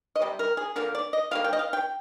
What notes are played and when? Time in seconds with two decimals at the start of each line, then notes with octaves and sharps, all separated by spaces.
0.16 D#5
0.22 C3 G3
0.39 A#4
0.57 G#4
0.76 D3 F3 A#3 A#4
0.95 D5
1.13 D#5
1.31 D3 G3 A#3 F5
1.44 G5
1.53 D#5
1.59 F5
1.73 G5